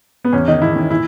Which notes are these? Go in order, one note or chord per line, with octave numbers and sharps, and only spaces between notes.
B3
E2 C#4
D#3 D#4
E2 E4
D#3
A#2 E4